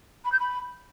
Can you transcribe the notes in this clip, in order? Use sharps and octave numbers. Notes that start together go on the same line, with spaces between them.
B5
G6
B5